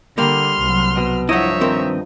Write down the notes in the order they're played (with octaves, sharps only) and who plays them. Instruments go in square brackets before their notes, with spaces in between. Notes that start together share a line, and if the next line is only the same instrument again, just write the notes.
[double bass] D3 [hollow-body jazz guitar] G3 A#3 A#4 [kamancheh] C6 F6
[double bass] C2 F#3
[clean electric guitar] B2
[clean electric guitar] G2 D#4 D#5 [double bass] F3 [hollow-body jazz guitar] E4 F#5 [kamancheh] C#5 E5
[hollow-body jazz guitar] D#3 C4 A#4